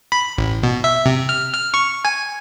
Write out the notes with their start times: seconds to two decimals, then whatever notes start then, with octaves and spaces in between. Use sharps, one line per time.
0.12 B5
0.38 A1
0.63 B2
0.84 E5
1.06 C3
1.29 F6
1.53 F6
1.74 C#6
2.05 G#5